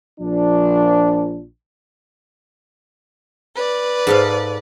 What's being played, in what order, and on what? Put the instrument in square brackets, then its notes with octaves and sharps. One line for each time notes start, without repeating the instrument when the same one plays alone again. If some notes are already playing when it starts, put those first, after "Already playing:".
[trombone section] A#1 F3 D4
[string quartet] B4 D5
[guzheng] G#2 A4 F5